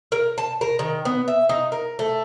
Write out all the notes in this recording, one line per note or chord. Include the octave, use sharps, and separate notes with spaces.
A#4
A5
A#4
D#3
B3
E5
D#4
A#4
A3